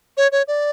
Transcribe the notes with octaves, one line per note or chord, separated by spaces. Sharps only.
C#5
C#5
D5